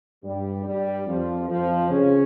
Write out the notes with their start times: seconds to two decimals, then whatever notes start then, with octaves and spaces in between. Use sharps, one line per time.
0.24 G2 G3
0.65 G2 G3
1.07 F2 F3
1.48 F2 F3
1.90 C#3 C#4